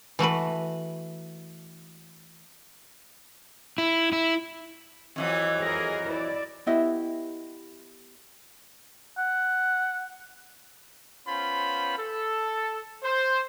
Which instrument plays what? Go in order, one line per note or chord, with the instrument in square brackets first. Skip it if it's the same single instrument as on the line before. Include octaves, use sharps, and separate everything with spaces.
[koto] E3 A3 F#4 B4
[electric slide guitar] E4
E4
[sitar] F2 E3 F#3
[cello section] G#4 A#4
E4 D5
[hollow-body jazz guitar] B3 E4 G4 D#5 E5
[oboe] F#5
[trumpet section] B3 C#4 F4 C5 B5
A4
C5